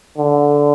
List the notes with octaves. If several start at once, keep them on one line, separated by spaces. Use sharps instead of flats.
D3